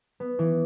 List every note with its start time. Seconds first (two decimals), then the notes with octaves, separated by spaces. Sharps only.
0.20 B3
0.39 E3